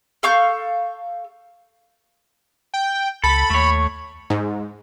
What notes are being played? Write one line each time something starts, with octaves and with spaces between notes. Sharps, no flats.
A4 F5 C#6 G6
G5
C#2 A4 B5
D#2 A3 C#5
G#2